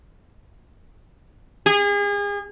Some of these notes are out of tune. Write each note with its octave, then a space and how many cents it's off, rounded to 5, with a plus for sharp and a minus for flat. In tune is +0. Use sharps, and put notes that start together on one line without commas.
G#4 -35